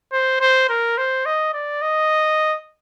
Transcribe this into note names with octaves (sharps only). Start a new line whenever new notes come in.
C5
C5
A#4
C5
D#5
D5
D#5